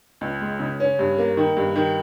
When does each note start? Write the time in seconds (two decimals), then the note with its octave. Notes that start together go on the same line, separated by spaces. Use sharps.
0.21 C#2
0.41 G#3
0.60 C#3
0.80 C#4
0.99 G2
1.18 A#3
1.37 D#3
1.57 G2
1.76 D#3